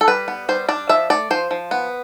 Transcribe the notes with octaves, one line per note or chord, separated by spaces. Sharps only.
A4
G3 B4
B3
G3 C5
D4 D5
F3 E5
A3 D5
F3 C5
F3
B3